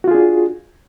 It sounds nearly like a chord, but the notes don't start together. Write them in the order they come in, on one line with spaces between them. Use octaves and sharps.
F#4 F4 G#4 D4